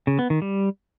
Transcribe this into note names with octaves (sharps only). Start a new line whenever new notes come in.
C#3
B3
D#3
G3